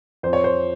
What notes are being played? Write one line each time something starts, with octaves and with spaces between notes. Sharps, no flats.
F2 C5
C#5
C5